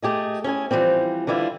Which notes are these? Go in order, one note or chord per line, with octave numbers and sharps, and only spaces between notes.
A3 G4 G#4 D#5
C#4 E4 G#4 G#5
E3 F3 G3 C4
D3 E3 G3 E4 F4